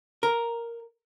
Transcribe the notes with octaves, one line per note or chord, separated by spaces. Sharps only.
A#4